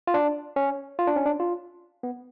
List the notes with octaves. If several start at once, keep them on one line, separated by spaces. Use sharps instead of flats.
F4
D4
C#4
F4
D4
C#4
D4
F4
B3